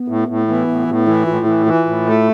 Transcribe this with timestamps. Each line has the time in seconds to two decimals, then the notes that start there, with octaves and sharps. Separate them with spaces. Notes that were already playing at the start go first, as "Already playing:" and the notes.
Already playing: B3
0.08 A2
0.28 A2
0.48 E3 B3
0.67 A2
0.87 A2
1.07 E3 E4
1.26 A2 F4
1.46 E3 E4
1.66 E3 F4
1.86 A2
2.06 A3